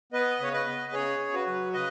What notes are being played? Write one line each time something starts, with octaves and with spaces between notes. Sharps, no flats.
B3 B4 D#5
C#3 C#5
B4 D#5
B3
C#3 G#4 C#5
C#3
F#4 B4
F#3
C#3 B4 D#5